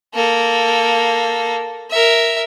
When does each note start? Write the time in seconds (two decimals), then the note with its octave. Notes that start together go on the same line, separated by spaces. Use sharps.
0.15 A#3 A4
1.91 A#4 E5